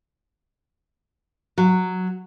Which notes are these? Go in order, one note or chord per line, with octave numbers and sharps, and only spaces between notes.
F#3